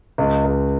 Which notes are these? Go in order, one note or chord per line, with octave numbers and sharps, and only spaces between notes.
C#2
C#2